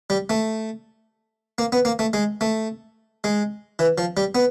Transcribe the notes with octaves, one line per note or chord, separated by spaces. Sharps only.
G3
A3
A#3
B3
A#3
A3
G#3
A3
G#3
E3
F3
G3
B3